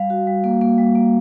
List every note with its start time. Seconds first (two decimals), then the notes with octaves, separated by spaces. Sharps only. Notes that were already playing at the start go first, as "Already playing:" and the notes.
Already playing: G3 F5
0.10 F#4
0.27 G3
0.44 A#3
0.61 A#3
0.78 G3
0.95 A#3